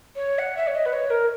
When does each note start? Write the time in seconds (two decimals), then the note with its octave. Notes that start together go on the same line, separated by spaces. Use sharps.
0.16 C#5
0.39 F#5
0.57 E5
0.67 C#5
0.75 D#5
0.86 B4
0.93 C#5
1.10 A#4